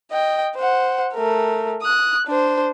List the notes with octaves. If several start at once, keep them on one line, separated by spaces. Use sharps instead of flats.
D#5 G5
C5 F#5
A3 A#4
D#6 F#6
D4 C5